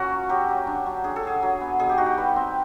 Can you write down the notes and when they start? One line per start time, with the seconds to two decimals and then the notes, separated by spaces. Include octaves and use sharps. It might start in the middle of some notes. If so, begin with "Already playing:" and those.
Already playing: A#2 A#3 C#4 F#4
0.11 F#3
0.29 F#3 G4
0.48 F#3
0.67 D4
0.86 F#3
1.04 D4 G#4
1.16 A4
1.23 F#3 G#4
1.43 F#3
1.61 B3
1.79 B2 G#4
1.89 G4
1.98 D#4 F#4
2.06 G4
2.18 G3 B4
2.36 C4